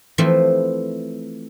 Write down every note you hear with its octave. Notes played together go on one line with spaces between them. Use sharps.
E3 F3 A3 C4